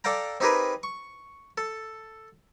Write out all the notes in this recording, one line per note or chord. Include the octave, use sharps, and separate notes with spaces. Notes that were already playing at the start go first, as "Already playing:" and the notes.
A4 D5 F5 G5 A#5
C4 D#4 G4 G#4 A#4 B4
C#6
A4